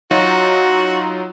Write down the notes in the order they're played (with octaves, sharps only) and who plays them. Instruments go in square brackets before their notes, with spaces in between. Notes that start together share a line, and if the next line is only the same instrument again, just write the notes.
[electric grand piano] F#3 D#4 F4 [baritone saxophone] F#4